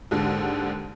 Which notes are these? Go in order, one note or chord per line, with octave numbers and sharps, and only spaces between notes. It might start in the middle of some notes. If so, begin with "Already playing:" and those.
D#2 G#2 D3